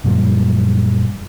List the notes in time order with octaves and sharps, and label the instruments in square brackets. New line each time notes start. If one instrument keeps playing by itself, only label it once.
[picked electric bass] F#2 A#2 F3 G3